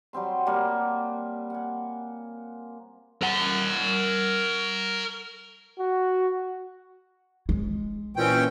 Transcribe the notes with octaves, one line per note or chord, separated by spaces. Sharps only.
F#3 G3 C4 C6
G3 A#3 F#5 A5
F#5 G#5
A#4 F#5
F#4
G#3
A#2 E3 C4 C#4 G5